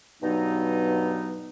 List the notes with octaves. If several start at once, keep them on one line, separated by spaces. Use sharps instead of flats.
G2 B2 F#3 B3 D#4